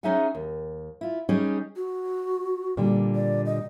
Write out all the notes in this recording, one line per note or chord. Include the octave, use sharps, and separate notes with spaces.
C#4 D#4 G#4 E5 F#5 G#5
D#2
E4 F4
G3 C#4 D#4 G4 G#4
F#4
A#2 D3 G3
D5
D#5